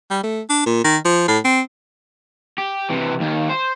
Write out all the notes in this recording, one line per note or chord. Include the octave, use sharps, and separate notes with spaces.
G3
A3
D4
A#2
D#3
F3
A2
C4
G4
C3 E3
D#2 D#3
C5